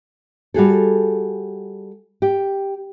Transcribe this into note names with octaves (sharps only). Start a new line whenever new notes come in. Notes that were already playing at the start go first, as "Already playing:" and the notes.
G3 F#4 G#4 A4
G4